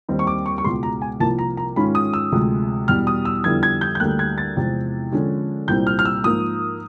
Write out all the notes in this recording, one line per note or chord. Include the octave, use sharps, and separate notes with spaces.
D#2 D#3 G3 C4 D#4
C#6
D6
C#6
C#6
C#2 B2 G#3 C6
A#5
G#5
C2 C3 F3 A#3 A5
A#5
A#5
G#2 D#3 G#3 C#4 F4 B5
D#6
E6
D2 C3 F3 G#3
E2 B2 G3 F6
D#6
E6
F2 D3 G3 B3 E4 G#6
G#6
G6
G6
D2 D3 G3 A#3 F#6
G#6
A6
E2 C3 F3 G#3 C4
D3 F3 G#3 C#4
C2 A#2 G3 C4 G6
F6
F6
E6
G#2 F3 A#3 D#6